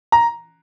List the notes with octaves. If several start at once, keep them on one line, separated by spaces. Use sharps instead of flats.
A#5